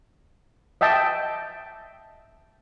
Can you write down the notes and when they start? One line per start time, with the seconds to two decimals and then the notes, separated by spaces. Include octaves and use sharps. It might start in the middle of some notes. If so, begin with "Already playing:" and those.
0.81 D#5 E5 G5 A5